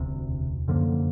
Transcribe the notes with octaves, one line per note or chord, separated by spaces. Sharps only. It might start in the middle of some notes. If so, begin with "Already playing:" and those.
Already playing: E1 D2 C3
F#2 D3 F3 A#3